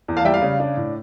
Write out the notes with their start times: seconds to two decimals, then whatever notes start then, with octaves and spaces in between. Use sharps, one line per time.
0.08 E2
0.17 F5 A5
0.25 G3 E5 G5
0.34 F5
0.42 C#3
0.60 D4
0.77 A2